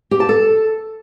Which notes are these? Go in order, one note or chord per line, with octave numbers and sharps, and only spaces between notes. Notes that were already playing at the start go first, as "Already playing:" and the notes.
G4
A5
A4